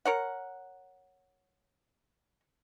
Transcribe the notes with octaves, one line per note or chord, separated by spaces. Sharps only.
A#4 C#5 F#5